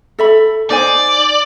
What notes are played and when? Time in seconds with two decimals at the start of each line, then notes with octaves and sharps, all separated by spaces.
0.19 A4 E5 B5
0.70 D#4 C5 D5 G#5